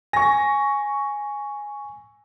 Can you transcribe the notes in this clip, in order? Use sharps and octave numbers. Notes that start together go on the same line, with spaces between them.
G#5 C#6 A#6